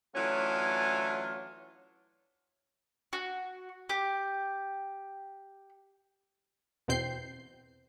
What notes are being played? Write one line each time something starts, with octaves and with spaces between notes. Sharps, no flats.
E3 F#3 A3 C#4 D4 F4
F#4
G4
E2 B2 C4 G6 C7